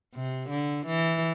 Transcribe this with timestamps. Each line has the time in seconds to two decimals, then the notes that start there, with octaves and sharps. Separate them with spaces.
0.15 C3
0.50 D3
0.86 E3